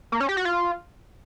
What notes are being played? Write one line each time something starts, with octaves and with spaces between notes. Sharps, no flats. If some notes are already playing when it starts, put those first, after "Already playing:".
A#3
C#4
G4
F#4
F4